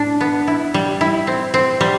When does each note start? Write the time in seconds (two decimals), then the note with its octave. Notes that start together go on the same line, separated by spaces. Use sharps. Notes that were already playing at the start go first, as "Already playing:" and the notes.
Already playing: A2 D4
0.21 B3
0.47 E4
0.74 G3
1.01 E4
1.27 C4
1.54 C4
1.81 G3